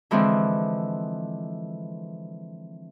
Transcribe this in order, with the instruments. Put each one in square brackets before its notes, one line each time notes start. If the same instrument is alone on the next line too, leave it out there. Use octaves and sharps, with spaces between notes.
[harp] D3 E3 F3 G#3 C4